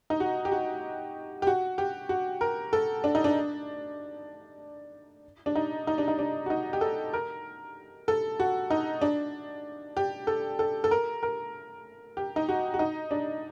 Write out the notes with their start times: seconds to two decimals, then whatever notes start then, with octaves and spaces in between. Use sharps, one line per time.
0.10 D#4
0.20 F#4
0.45 G4
0.52 F#4
1.42 G4
1.47 F#4
1.78 G4
2.09 F#4
2.41 A#4
2.73 A4
3.04 D4
3.15 D#4
3.24 D4
5.46 D4
5.55 D#4
5.87 D#4
5.98 D4
6.08 D#4
6.19 D4
6.46 F#4
6.50 D#4
6.73 G4
6.81 A4
7.13 A#4
8.08 A4
8.39 F#4
8.70 D#4
9.01 D4
9.97 G4
10.27 A4
10.59 A4
10.84 A4
10.91 A#4
11.23 A#4
12.17 G4
12.36 D#4
12.49 F#4
12.74 F#4
12.79 D#4
13.11 D4